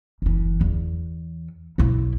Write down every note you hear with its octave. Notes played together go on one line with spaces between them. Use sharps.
F#1 E3
E2
B1 E4